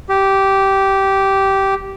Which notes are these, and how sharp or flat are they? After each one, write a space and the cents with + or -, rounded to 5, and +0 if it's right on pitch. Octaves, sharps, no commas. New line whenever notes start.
G4 -10